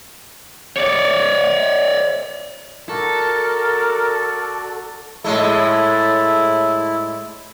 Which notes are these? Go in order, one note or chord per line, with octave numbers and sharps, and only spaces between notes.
C#5 D5
F#4 A4 A#4 D5
A2 G#3 A3 E4